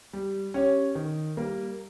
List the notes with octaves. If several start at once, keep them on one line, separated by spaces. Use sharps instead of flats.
G3
C#4 G4 C#5
D#3
G3 A#3